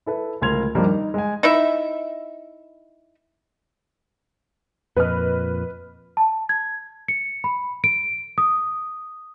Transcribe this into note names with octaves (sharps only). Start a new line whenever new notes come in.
E4 A4 B4
D1 C#2 A#4 C6 G#6 F7
G2 D#3 F3 G3 A#3 D#4
D#4
G#3 G#5
D#4 E4 E5
F2 A#2 B4 D#5 F6
A5
G#6
C#7
B5
D7
D#6